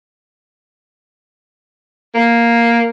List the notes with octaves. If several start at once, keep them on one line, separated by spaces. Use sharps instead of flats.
A#3